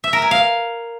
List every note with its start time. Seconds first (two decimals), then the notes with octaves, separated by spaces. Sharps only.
0.04 E5
0.13 A#4
0.22 G#5
0.31 F5